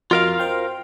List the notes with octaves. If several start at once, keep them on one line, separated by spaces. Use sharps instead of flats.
F2 F4 F#4 A#4 D#5 F5
C5 G5 C6